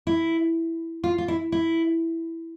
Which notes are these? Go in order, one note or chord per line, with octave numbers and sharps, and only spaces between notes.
E4
F4
F4
E4
E4